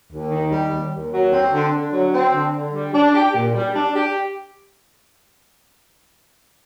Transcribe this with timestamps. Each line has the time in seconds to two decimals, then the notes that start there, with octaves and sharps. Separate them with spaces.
0.11 D#2
0.31 D#3
0.50 G3
0.71 D#2
0.92 D#2
1.12 F#3
1.32 C4
1.52 D3
1.73 D3
1.92 F#3
2.12 C4
2.34 D3
2.54 D3
2.74 G3
2.94 D4
3.14 G4
3.34 A#2
3.55 G3
3.75 D4
3.95 G4